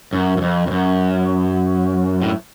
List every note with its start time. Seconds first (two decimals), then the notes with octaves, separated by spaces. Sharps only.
0.13 F#2
0.37 F#2
0.42 F2
0.67 F2
0.71 F#2
2.22 A2